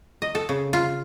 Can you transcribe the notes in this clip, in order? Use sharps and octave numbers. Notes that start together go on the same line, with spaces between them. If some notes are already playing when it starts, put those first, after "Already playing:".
D#5
A4
C#3
F4